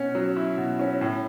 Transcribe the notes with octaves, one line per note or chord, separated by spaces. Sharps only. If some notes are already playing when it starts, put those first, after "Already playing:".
Already playing: B2 C#4
F#3
E4
B2
C#4
A2